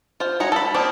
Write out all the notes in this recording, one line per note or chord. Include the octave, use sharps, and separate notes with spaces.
F4 C5
G#3 F#4 C#5 A#5
A4 B5
F3 A#3 C4 D4 D#4